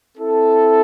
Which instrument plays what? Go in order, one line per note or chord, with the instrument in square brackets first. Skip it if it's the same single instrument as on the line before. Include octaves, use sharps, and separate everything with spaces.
[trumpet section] C4 E4 A4